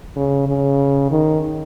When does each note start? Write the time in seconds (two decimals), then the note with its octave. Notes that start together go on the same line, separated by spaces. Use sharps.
0.16 C#3
0.48 C#3
1.11 D#3